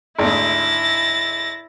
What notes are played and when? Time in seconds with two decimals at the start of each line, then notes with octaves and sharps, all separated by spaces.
0.19 G#1 D2 E4 A6 A#6